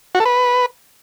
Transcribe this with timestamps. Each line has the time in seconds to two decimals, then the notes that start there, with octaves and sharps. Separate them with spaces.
0.15 F#4
0.20 A4
0.25 B4